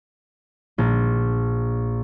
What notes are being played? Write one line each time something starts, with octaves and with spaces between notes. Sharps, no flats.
A#1